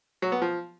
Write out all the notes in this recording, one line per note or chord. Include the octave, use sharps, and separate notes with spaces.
F#3
B3
F3